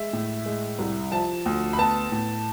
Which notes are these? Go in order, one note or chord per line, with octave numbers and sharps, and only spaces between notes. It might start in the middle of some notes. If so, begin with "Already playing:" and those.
Already playing: G#3 E5
A2
G#3
C2
F3 A5
D2
B5
B3 A5
A2